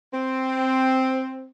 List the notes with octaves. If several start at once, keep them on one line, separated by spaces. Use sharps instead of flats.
C4